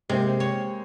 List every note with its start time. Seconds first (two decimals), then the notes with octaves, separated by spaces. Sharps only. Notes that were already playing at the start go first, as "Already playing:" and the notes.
0.09 C3 G#3 A#3 C5
0.40 C#5